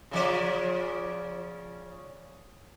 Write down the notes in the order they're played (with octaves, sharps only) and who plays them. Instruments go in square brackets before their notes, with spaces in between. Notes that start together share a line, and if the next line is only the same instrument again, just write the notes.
[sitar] C#3 F3 D5